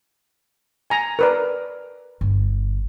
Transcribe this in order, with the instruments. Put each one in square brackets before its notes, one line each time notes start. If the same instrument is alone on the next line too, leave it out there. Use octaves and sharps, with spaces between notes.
[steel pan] G#5 A#5
A#4 B4 D5
[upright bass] G1